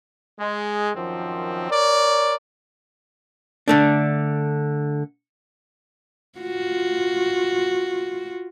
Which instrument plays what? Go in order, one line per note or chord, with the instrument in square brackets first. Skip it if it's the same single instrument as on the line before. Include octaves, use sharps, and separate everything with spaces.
[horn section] G#3
F#2 D#3 F3 C4
A#4 C#5 D5
[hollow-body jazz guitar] D3 A3 D4
[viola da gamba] F4 F#4